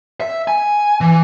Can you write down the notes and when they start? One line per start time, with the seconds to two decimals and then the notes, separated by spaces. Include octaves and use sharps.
0.20 E5
0.48 G#5
1.01 E3